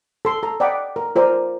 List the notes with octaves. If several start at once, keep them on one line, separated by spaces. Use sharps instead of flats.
A4 C6
A4 A#5
D5 D#5 F#5 G5 B5 D6
A#4
F4 A#4 C5 D5 G#5